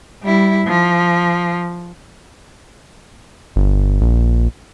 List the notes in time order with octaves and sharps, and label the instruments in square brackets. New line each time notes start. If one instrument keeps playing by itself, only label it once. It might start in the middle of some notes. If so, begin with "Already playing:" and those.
[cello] G3 E4
F3
[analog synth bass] G1
A#1